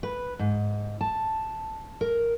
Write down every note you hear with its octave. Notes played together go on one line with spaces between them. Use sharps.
B4
G#2
A5
A#4